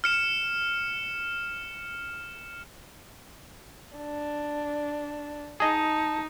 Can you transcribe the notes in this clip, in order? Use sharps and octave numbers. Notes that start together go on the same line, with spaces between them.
F6 C#7 E7
D4
D#4 G#4 D#5 A5